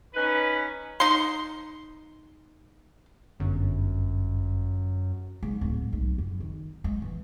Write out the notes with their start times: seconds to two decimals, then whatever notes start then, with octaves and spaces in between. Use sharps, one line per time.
0.14 C#4 D#4 B4
1.00 D#4 C6
3.40 G1 F#2
5.43 G#2
5.61 D1
5.93 B1
6.18 F#2
6.40 D#3
6.84 G#3
7.02 E3